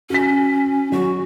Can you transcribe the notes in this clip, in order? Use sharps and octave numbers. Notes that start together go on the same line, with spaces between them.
C#4 F#4 B6
F#3 F#4